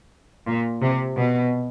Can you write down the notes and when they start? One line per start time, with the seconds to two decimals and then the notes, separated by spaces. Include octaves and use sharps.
0.46 A#2
0.81 C3
1.17 B2